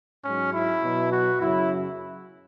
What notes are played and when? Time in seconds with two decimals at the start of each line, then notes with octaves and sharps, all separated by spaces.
0.25 G#2 F#3 C#4
0.53 E4
0.83 B2 F#3
1.12 F#4
1.41 F#2 C#3 F#3 E4